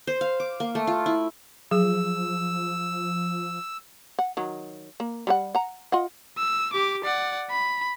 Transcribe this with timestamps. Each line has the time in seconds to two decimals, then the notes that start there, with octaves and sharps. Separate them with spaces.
0.07 C5
0.21 F5
0.40 D6
0.60 A#3
0.75 A3
0.87 F4
1.06 E4
1.71 F3 F#3 G#4 E6
4.19 F#5
4.37 D#3 F#3
5.00 A#3
5.27 G3 A4 F#5
5.55 F#5 A#5
5.92 F4 D#5 F#5
6.37 E6
6.73 G4 D6
7.04 D5 F#5
7.50 B5